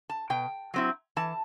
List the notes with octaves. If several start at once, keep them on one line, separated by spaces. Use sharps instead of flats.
A5
B2 G5
F#3 C4 E4
E3 A5